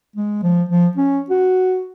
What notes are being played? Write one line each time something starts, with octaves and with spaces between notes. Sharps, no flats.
G#3
F3
F3
C#4
F#4